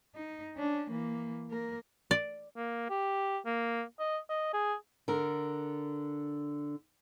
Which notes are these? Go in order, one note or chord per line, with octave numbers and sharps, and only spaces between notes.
D#4
C#4 D4
E3 A#3
A#3 A#4
D5
A#3
G4
A#3
D#5
D#5
G#4
D3 A#4